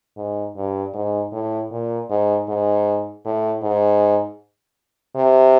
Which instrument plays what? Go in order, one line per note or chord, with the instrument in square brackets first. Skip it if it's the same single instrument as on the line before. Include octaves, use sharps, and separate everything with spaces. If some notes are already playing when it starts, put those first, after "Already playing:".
[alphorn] G#2
G2
G#2
A2
A#2
G#2
G#2
A2
G#2
C3